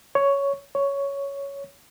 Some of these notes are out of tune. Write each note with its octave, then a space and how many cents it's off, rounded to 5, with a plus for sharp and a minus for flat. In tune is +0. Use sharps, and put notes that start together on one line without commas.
C#5 +5
C#5 +5